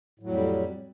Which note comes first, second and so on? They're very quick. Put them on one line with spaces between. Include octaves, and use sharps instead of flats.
A2 F#3 F2 G3